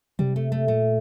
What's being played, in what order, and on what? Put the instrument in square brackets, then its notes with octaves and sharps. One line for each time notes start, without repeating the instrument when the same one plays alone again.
[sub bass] C3 [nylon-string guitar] G3
[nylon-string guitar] A3
A3
[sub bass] A#2 [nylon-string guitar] A3